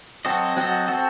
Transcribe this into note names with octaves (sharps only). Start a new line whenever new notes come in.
F#3 C4 F#4 A4 D#5
F#3 C4 F#4 A4 D#5
C4 F#4 A4